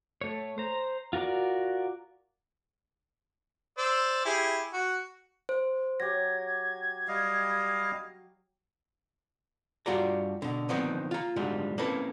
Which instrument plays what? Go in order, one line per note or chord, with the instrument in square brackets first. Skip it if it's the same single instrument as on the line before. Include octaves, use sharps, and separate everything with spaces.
[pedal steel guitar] A3 C#5
C5 A#5
F4 F#4 A#4 D5
[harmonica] C5 D5 E6
E4 G4 G#4
F#4
[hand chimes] C5
[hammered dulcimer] F#3 G4 [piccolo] G#6 [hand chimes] A#6
[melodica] G3 D#5 F5
[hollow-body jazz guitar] G2 G3 F4 F#4 D5 A#5
B2 D3
D3 D#3 F3 B3 C4 D#4
F4 A#5
G#2 D3 F#3 G3 F4
A#3 C4 C#4 E4 A4 B4